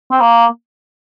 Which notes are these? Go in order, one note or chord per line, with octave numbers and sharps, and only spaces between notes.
C4
A#3